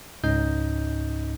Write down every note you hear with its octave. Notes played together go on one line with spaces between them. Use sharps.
C#2 G#2 C#4 D#4 D#5 G6